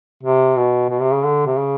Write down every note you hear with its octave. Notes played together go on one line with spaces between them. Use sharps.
C3
B2
B2
C3
C#3
D3
C3
C#3